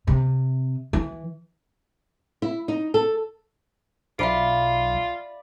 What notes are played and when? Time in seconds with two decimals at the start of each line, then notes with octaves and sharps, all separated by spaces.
0.07 C3
0.93 E3
2.42 E4
2.68 D#4
2.94 A4
4.19 B1 F4 D5 E5 F5 B5 D7